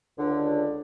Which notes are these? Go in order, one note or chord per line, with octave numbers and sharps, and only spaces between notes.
C#2 D3